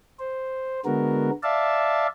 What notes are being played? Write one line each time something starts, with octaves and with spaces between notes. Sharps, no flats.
C5
D3 G#3 B3 F#4 A#4
D5 E5 F5 A5